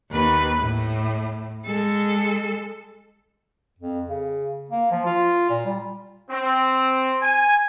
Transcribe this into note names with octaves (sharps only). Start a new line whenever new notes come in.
D#2 B4
A2
G#3 A4
F2
C#3
A#3
F3
F4
A#2
G3
C4
G#5